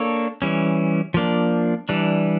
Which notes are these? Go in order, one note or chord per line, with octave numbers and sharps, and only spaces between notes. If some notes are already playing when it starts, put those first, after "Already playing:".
Already playing: A#3 D4 A4 C#5
E3 G3 C#4
F3 A#3 D4
E3 G3 D4